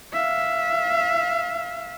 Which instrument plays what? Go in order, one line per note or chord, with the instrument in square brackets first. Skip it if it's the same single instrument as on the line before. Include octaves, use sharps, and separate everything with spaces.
[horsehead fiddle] E5 F5